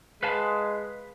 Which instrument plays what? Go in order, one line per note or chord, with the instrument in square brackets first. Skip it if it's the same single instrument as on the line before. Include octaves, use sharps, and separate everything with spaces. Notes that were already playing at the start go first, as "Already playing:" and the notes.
[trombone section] G#3 [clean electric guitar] B4 F5 A5